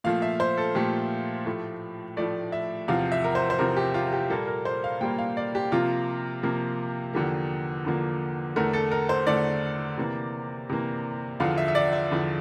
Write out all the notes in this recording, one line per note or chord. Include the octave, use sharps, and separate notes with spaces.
A#2 F3 A3 F5
E5
C5
A4
A#2 F3 A3 G4
A2 F3 A3
A2 F3 A3 D5
E5
E2 C3 F3 F5
E5
A#4
C5
C5
E2 C3 F3 A#4
G4
F4
G4
A#2 G3 A#3 A4
A#4
C5
F5
A#2 G3 A#3 G5
F5
D5
G4
C3 F3 A#3 F4
C3 F3 A#3
E2 D3 F3 A#3 G4
E2 D3 F3 A#3
E2 D3 A3 A#4
A4
A#4
C5
E2 D3 A3 D5
C3 E3 A#3
C3 E3 A#3
E2 D3 F3 F5
E5
E5
D5
E5
E2 D3 F3